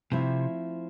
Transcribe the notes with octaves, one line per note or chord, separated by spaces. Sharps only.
C3 F3 A3 C4 E4